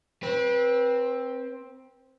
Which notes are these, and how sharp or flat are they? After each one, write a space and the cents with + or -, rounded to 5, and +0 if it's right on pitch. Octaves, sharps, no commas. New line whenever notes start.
C4 +10 B4 -30